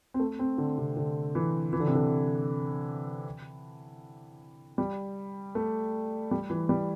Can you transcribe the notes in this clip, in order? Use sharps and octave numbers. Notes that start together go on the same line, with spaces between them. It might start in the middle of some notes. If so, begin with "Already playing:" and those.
C4
A3
C4
D3
C3
D3
E3
E3
D3
C3
D3
G3
A3
G3
E3
G3